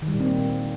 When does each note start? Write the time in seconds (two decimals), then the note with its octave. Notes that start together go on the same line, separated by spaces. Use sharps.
0.02 D#3
0.08 G3
0.14 A#2
0.20 C4
0.25 A#3